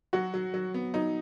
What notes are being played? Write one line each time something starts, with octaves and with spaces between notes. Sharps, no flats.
F#3 F#4
F#3
F#3
B3
F#3 D#4